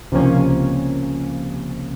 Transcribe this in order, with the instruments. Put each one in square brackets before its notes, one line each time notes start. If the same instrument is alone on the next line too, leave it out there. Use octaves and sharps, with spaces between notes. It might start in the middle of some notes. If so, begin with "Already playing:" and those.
[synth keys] C#2 C3 F3 A#3 C#4